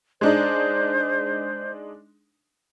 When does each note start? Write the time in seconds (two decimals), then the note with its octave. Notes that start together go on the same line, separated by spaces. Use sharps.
0.21 G#3 D4 D#4 C5